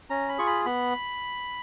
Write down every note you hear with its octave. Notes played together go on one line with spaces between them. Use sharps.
C#4 A#5
B5
F4 G#4 C#6
B5
B3 B5